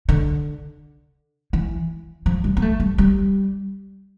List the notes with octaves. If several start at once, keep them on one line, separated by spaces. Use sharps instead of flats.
D3
E3
F3
G3
B3
A3
G3
G3